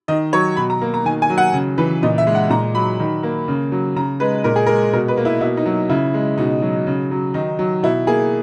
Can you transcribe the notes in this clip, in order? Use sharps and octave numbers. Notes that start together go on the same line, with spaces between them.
D#3 D#5
F#3 C#5
B2 B5
A#5
A#3
A#5
D#3 G#5
G#5
F#3
F#5
C#3
E3 B4
A#2 D#5
E5
G#3
F#5
A#2 A#5
F#3 B5
D#3
A#3
C#3
F#3
C#3 A#5
G#3 B4
A#2 A#4
G#4
G#3 A#4
B2 A#4
B4
A#3
E4
B2 E4
D#4
F#3
C#3 E4
G#3
B2 D#4
F#3
C#3
F#3
D#3 D#4
F#3
B2 E4
A#3 G#4